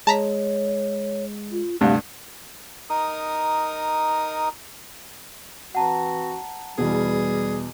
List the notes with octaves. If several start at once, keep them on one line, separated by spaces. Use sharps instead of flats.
G#3 C#5 A5 A#5 B6
F4
D2 G2 C3 F5
D#4 A#4 D#6
E3 C4 F#4 F#5 A5 A#5
E2 B2 G3 G#4